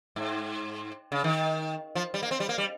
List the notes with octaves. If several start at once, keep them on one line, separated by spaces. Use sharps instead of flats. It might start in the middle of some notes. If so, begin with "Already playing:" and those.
G#2
C#3
D#3
F3
G3
A#3
C4
G3
A#3
G3